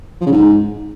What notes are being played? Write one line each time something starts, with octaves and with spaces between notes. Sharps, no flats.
F3
C#3
G#2